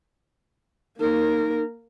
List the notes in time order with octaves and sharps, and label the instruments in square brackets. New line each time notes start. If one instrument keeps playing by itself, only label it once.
[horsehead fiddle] A#3 A#4 [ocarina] D#4